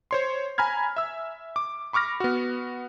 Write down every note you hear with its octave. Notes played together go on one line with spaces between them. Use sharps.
C5 C#5 C6
G#5 A#5 B5 F6 G#6
E5 E6
D6
B5 C#6 D6 F6 A#6
B3 F#4